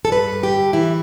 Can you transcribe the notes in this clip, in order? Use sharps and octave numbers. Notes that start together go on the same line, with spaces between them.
A4
G2 B4
G2
G4
D3
E3 E4